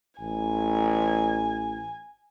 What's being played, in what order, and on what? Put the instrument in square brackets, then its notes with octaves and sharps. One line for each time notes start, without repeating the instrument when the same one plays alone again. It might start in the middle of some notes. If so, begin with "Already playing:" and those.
[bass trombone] A1 [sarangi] G#5